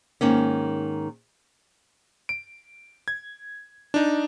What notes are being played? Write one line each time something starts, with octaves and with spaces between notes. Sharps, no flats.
G#2 D#3 A#3 C#4
D7
G#6
D4 D#4